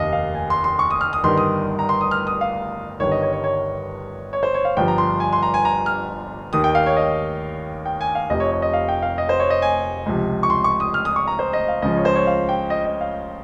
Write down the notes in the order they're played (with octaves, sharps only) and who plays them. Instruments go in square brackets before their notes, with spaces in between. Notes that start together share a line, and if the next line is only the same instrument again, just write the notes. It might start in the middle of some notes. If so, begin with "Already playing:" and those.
Already playing: [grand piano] F1 D#2 D#3 D#5 F5
F5
G#5
C6
C6
C#6
D#6
F6
D#6
G1 G2 D#3 C6
D#6
A#5
C6
D#6
F6
D#6
F5
G1 G2 D#3 C#5
D#5
C#5
C#5
C#5
C#5
C5
C#5
F5
G1 G2 F3 G5
A#5
C6
G#5
C6
A#5
G#5
A#5
F6
D#2 D#3 D#6
G5
F5
C#5
D#5
G5
G#5
F5
F1 F2 C3 F3 D#5
C#5
C#5
D#5
F5
G5
F5
D#5
C5
C#5
D#5
G#5
C#2 C3 F3
C#6
C6
C#6
D#6
F6
D#6
C#6
A#5
C5
D#5
F5
C#2 C#3 F3 D#5
C#5
C5
C#5
F5
G5
D#5
D#5
F5